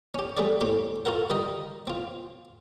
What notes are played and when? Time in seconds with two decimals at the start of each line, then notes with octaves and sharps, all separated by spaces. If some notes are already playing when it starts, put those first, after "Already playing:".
0.14 C#4 G4
0.37 G3 A3 C4 G#4 D5
0.61 A2 C4 G4 D6
1.05 F4 F#4 A4 A#4 F#5
1.30 D#3 G3 D#4 D#5
1.87 C4 F4